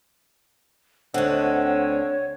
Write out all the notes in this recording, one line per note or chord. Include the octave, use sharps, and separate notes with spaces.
D2 D3 C4 C#5 D#5 F#5